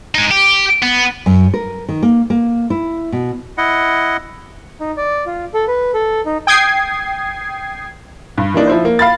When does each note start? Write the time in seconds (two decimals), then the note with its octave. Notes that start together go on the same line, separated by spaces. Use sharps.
0.15 G#3 D#4
0.31 G4
0.83 B3
1.26 F#2
1.54 A#4
1.89 D#3
2.03 A#3
2.30 A#3
2.70 E4
3.12 B2
3.58 E4 D#5 F#5
4.80 D#4
4.97 D5
5.26 F4
5.54 A4
5.68 B4
5.94 A4
6.26 D#4
6.47 G5 D#6 G#6 C7
8.38 G2
8.54 E3 A#3 D4 D#4
8.67 F3 E4 C5
8.85 A#3
8.99 F5 B5 A6